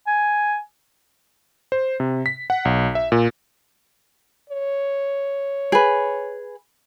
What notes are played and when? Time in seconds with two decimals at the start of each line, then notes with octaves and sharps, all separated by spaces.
0.07 G#5
1.72 C5
2.00 C3
2.26 B6
2.50 F#5
2.65 B1
2.95 E5
3.12 A#2
4.50 C#5
5.72 G#4 B4